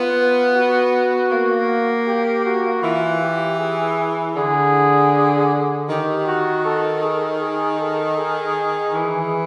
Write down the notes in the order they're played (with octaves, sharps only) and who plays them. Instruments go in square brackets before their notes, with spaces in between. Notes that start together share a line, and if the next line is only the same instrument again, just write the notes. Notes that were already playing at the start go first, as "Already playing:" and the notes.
Already playing: [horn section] B3 [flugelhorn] F4
[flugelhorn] F#4
[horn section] A#3
[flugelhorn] G4
F#4
[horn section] E3 [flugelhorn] F4
[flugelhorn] G4
G#4
[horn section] D3 [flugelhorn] G#4
[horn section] D#3 [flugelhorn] G4
[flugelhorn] F#4
A4
G#4
G#4
A4
G#4
[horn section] E3